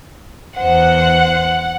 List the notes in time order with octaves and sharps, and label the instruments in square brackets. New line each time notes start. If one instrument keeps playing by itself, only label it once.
[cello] E2 C5 [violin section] F#5